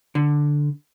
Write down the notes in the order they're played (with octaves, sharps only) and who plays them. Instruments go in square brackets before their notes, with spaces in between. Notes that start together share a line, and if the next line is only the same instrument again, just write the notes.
[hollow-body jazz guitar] D3